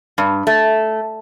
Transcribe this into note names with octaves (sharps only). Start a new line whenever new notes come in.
G2
A3